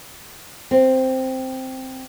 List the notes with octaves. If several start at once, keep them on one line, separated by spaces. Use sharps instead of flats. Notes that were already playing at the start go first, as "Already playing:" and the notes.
C4